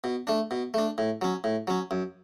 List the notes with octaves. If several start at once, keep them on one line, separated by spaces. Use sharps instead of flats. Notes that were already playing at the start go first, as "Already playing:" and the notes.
B2
A3 D4
B2
A3 D4
A2
F#3 C#4
A2
F#3 C#4
F#2